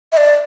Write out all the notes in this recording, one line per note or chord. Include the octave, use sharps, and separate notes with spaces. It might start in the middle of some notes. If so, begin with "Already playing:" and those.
E5
D5